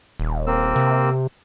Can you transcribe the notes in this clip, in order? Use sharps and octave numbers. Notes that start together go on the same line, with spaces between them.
D#1
A#3 C4 E6
C3